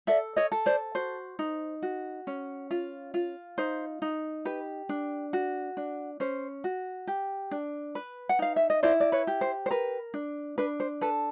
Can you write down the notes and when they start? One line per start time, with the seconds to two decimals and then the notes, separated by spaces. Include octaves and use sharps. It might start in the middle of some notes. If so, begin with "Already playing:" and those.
0.07 A4 D5 E5
0.36 C#5 D#5
0.52 A4
0.66 C5 D5
0.95 F#4 C5
1.39 D#4
1.82 F#4
2.27 C#4
2.71 F4
3.14 F4
3.58 D#4 C5
4.02 D#4
4.45 G4 B4
4.89 D4
5.33 F#4
5.77 D4
6.20 C#4 C5
6.64 F#4
7.07 G4
7.51 D4
7.95 B4
8.29 F#5
8.39 D#4 F5
8.56 E5
8.70 D#5
8.83 E4 C5 D5
9.00 D5
9.12 B4 C#5
9.27 G4
9.41 C5
9.66 C5
9.70 A#4 B4
10.14 D4
10.58 D4 B4
10.80 C5
11.01 A4 B4